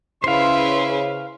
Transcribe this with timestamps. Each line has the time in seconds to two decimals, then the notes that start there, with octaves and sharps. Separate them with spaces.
0.24 C#3 E4 B4 C5 F5 C6